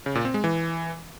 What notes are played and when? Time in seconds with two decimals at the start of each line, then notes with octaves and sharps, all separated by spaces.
0.06 C#3
0.15 A#2
0.25 C4
0.34 G#3
0.44 E3